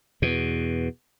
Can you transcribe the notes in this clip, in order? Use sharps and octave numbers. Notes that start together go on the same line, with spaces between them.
E2 B2